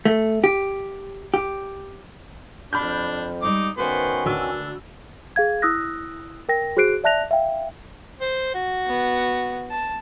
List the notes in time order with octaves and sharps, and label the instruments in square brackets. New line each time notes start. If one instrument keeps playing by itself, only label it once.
[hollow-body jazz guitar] A3
G4
G4
[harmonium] F2 [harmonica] D4 [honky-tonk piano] B5 F6 G6
[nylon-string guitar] G3 G#3 [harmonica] D#4 D6
[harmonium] D#3 C#4 F#4 [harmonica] B3 C5 [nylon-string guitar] B4 E5
[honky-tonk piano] D2 E6 [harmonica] D4 [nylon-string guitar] A#4 G#5
[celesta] G#4 F5 G#6
E4 D#6 E6 F#6 A#6
A#4 G5 A#6
F#4 G#4 C5 F#6 C7 D7
D5 E5 A5 F#6 A#6 F7
E5 F5 G5
[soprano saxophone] C5
F#4
[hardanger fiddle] B3
A5